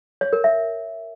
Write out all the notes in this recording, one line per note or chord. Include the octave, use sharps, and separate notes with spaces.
C#5
A#4
E5